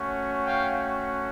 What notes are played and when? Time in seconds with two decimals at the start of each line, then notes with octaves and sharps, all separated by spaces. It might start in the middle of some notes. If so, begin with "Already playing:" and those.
Already playing: A3 C#4 F#4
0.44 F5 G5